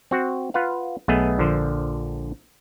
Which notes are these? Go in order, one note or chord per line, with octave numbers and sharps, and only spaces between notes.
C4 F#4 F#5
F4 B4 F5 F#5
B1 A3 B3 G#4 D#5
A#1 D3 F3 C5